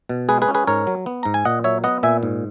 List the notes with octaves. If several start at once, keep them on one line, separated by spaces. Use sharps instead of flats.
B2
G#3 G#4 B4
G#4 B4
C#4
G#4 B4
G#2 A#4 C#5
F#3
B3
G#2 A#5
G#5
A#2 D#5 F#5
F#3 C#5 E5
B3 D#5 F#5
A#2 E5 G#5
G#2